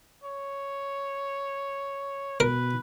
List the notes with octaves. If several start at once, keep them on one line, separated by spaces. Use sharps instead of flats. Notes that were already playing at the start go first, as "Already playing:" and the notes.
C#5
B2 A#4 B4